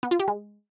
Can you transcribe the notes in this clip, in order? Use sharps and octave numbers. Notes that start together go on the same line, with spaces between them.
B3
F4
G4
G#3